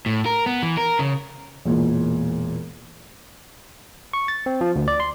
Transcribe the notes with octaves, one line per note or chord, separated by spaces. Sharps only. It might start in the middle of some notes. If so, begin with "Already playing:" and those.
A2
A#4
B3
E3
A#4
C#3
E1 A#2
C#6
A6
C4
F3
D2
D5
C6